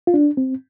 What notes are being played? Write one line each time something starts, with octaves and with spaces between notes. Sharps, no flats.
F4
D4
C4